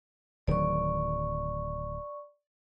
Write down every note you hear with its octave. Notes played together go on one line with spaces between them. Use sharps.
D1 D#3 F#3 D5 C#6